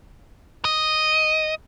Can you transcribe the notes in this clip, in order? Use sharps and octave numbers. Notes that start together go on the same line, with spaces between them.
D#5